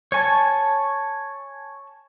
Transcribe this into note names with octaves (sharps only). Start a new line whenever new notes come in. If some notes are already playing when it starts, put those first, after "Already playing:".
C#5 G#5 A5